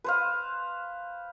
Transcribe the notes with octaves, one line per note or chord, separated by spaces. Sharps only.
B4 C5 F5